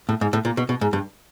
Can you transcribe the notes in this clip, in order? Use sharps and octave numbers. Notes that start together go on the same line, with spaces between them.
A2
G#2
A2
A#2
B2
B2
G#2
G2